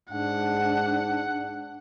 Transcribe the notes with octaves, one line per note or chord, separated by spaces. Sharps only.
G#2 D4 F#5